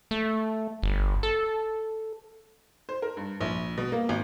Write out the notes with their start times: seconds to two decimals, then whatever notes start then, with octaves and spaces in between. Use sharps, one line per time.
0.11 A3
0.82 G1
1.23 A4
2.89 C5
3.02 A#4
3.17 G2
3.41 A#1
3.77 B2
3.92 A#3
4.09 G#1